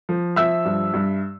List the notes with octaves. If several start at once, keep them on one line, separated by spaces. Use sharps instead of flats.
F3
F3 E5 E6
G2
G2